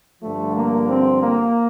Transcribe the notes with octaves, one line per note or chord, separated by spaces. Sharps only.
G2 D3 F3 A3
A#3
C4
A#3